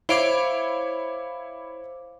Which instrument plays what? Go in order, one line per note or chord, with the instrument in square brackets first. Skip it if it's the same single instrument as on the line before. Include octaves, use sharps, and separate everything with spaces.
[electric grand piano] E4 C#5 D7 [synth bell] C5 F5 D6